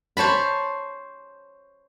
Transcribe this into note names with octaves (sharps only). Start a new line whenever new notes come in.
C5 C#5 A5 B5